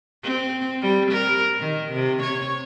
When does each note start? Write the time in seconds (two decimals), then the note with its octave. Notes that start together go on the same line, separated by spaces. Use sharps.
0.23 C4
0.82 G3
1.11 A#4
1.59 D#3
1.92 C3
2.23 C#5